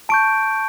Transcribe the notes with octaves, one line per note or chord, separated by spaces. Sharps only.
A5 C#6 G6 D7